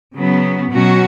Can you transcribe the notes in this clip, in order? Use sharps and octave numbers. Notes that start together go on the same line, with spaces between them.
C#3 F#3 B3
B2 F#3 C#4 F#4